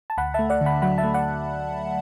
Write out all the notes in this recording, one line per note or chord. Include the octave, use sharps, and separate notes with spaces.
A5
D2 F#5 B5
A3 E5 A5
D5 F#5
D3
F#5 B5
F#3 F#5 B5
E5 A5
A3
D5 F#5